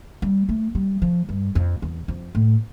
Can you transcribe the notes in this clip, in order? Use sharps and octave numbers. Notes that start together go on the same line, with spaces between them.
G3
A3
G3
F3
G2
F2
E2
F2
A2